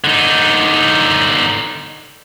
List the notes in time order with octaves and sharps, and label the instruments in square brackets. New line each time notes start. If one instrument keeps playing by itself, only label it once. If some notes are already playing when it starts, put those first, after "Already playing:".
[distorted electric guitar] D3 D#4